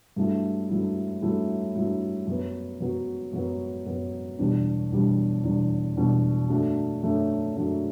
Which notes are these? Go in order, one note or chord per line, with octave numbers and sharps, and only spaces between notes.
G2 F#3 A3 E4
G2 F#3 A3 E4
G2 F#3 A3 E4
G2 F#3 A3 E4
F#2 F#3 B3
F#2 F#3 B3
F#2 F#3 B3
F#2 F#3 B3
E2 B2 G3 D4
E2 B2 G3 D4
E2 B2 G3 D4
E2 B2 G3 D4
F#2 F#3 A3 D4
F#2 F#3 A3 D4
F#2 F#3 A3 D4